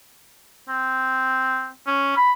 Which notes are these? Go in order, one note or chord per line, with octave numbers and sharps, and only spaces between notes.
C4
C#4
B5